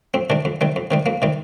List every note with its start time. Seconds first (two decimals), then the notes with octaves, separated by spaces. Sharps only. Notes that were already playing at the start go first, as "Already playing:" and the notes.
0.14 F2 C4
0.30 C3 D#3 G3 D4
0.45 F2
0.61 C3 D#3 G3
0.76 F2
0.91 C3 D#3 G3
1.06 F2 A#3
1.22 C3 D#3 G3